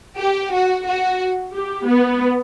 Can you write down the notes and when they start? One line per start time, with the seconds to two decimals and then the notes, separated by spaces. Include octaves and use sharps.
0.17 G4
0.52 F#4
0.85 F#4
1.53 G4
1.87 B3